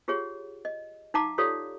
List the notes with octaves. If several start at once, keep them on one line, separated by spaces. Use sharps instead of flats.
F4 G4 G#4 C#5 F#5
D#5
D#4 F5 F#5 A5 A#5 D6
F4 G4 A4 C#5 D5 F5